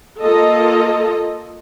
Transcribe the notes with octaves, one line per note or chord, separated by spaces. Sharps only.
A#3 F4 A4 D#5